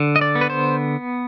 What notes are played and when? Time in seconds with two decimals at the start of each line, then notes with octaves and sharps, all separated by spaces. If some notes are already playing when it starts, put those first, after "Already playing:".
Already playing: D3
0.16 D#5
0.21 D5
0.35 B3
0.41 B4
0.50 C5